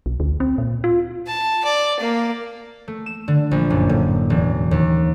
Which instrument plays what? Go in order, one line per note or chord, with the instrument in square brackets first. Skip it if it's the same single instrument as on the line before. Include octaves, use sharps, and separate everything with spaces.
[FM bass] B1
D2
C4
A#2
F4
[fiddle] A5
D5
A#3
[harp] A3
E7
D3
A#1
F#1
A2
E1
D#2